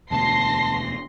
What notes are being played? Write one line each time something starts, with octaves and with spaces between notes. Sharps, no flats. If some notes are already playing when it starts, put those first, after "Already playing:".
E1 D2 B2 A5 C6 A#6 C7